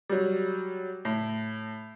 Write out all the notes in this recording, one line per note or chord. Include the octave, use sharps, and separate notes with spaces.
F#3 G3
A2